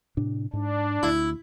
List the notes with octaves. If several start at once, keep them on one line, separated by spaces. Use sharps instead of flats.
A2 C3 D4
G#2 D4
D2 E4